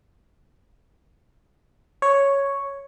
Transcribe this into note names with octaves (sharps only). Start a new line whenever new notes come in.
C#5